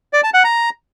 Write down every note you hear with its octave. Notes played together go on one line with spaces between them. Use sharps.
D5
A5
F#5
A#5